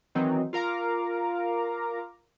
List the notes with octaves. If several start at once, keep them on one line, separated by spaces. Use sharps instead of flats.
D#3 E3 F#3 C4 D#4
F4 A#4 F5 A#5 D6